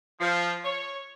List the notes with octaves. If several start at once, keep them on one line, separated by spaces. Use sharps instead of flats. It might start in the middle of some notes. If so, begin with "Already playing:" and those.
F3
C#5